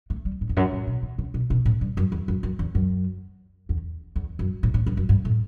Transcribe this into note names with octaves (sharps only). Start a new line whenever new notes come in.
A3
G3
A2
E2
F#2
A2
B2
D3
C#3
B2
B2
A2
G2
F#2
E2
F#2
F#2
E2
F#2
E2
E2
F#2
A2
A2
G2
F#2
G2
A2